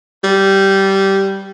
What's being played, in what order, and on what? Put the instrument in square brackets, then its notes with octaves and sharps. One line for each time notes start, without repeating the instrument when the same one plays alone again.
[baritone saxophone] G3